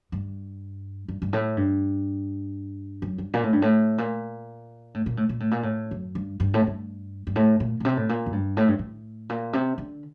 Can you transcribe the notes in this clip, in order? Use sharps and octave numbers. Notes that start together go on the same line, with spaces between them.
G2
G2
G2
A2
G2
F#2
G2
A#2
A2
G2
A2
A#2
A2
A#2
A2
A#2
A2
A#2
A2
F#2
G2
G2
A2
G2
G2
A2
A#2
A#2
C3
A2
A#2
F#2
G2
A2
G2
A2
A#2
C3
D3